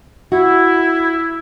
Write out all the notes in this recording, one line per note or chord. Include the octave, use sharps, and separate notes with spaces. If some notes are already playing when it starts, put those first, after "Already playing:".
E4 F#4